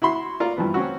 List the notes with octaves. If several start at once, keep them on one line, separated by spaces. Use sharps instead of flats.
E4 F#4 B5 C6
F4 A#4 D5
G2 E3 F3 B3
C4 C#4 F#4